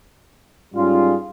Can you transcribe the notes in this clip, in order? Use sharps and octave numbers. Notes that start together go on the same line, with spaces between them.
G#2 G3 C#4 F4 G#4